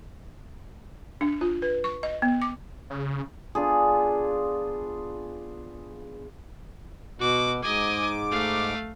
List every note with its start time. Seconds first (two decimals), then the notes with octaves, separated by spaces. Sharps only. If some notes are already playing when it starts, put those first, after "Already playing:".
1.21 D4
1.41 F4
1.62 B4
1.84 C#6
2.03 D#5
2.22 B3
2.42 D6
2.90 C#3
3.55 B3 D4 F4 G#4
7.19 B2 F#4 D6
7.63 G#2 D#5 G#5 D6
8.31 A3 F5